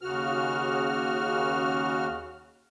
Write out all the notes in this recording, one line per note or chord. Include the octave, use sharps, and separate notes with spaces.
D#2 C#3 F#4 F6